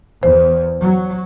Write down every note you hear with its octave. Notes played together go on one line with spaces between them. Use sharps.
E2 C5
F#3